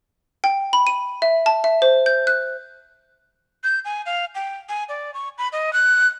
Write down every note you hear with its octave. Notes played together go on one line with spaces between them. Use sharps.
G5
B5
D#7
E5
A5
E5
C5
G6
F#6
G6
G#5
F5
G5
G#5
D5
C#6
B5
D#5
F#6